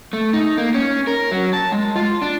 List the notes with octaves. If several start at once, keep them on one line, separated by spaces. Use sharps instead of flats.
A3
D#4
A#3
C#4
A#4
F#3
A5
G#3
F4
D4